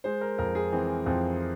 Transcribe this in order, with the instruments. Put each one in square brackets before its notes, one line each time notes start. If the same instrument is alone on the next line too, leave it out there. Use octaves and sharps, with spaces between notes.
[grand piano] G#3 C5
A#4
F2 A#4
G#4
E3 C4
F2 C4